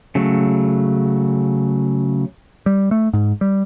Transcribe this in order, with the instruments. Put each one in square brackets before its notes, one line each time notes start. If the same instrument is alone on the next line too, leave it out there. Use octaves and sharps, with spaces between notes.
[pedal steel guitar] C#3 F#3 A3
[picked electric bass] G3
A3
G#2
G3